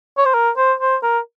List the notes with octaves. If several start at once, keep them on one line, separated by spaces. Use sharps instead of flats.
C#5
C5
A#4
C5
C5
A#4